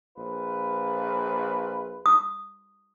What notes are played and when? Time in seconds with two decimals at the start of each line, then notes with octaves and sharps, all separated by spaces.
0.17 A#1 F4 B4
2.06 D#6